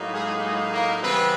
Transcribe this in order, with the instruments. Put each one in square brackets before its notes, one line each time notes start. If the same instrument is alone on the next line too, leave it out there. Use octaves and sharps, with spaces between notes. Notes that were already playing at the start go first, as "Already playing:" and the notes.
Already playing: [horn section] A2 F#3 A#3 D#4
G#3 G#4
G#3 G#4
A#3 A#4
C#3 E3 G3 B3 C4 B4